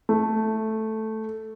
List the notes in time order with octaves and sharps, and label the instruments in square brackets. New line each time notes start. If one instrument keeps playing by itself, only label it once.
[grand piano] A3